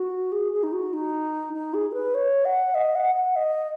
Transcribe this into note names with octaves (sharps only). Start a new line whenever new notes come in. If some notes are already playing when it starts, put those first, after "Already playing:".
Already playing: F#4
G#4
G#4
D#4
F#4
D#4
D#4
G#4
G#4
B4
C#5
F#5
D#5
F#5
F#5
D#5